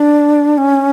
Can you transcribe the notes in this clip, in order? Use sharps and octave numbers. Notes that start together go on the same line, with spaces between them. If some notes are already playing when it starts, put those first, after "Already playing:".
Already playing: D4
C#4